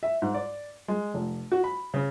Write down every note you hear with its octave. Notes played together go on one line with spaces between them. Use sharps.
E5
G#2
D5
G#3
F1
F#4
B5
C#3